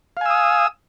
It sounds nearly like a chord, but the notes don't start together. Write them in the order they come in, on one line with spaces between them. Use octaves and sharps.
F5 G#5 E6 D#6